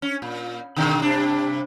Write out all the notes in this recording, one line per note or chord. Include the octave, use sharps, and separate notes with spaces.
C#4
A#2
B2 D3 D#3
G2 C3 D4